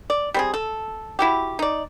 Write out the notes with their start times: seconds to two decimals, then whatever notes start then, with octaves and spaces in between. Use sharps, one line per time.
0.10 D5
0.34 G3 C4 G#4
0.54 A4
1.19 E4 F#4 G4
1.59 D#4 D5